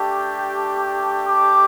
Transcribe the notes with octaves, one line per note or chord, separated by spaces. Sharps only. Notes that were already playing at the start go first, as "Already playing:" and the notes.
Already playing: A3 D4 G4
D6